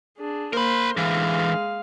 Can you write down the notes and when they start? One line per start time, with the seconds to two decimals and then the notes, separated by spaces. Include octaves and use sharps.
0.17 D4 G#4
0.53 A#3 A#4 C5 B5
0.97 D3 E3 G#3 F5